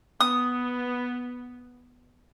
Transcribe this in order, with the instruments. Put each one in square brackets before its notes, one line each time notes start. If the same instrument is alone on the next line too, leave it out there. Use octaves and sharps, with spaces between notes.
[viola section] B3 [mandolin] D#6